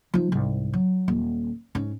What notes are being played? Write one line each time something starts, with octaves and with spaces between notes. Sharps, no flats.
F3 D#4
C2 G#2
F#3
D#1
G#2 C#4